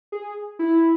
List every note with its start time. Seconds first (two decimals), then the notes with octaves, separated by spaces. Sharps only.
0.12 G#4
0.59 E4